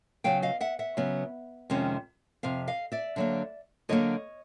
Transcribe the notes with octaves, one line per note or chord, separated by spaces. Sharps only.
C#3 F#3 B3 F5 G5
D#5 F5
E5 F#5
E5 F#5
C#3 F#3 B3
F2 C3 D#3 G#3 C#4
F2 C3 F5
D#5 F5
D5 E5
D3 F#3 A#3
D3 F#3 A#3 C#5 D#5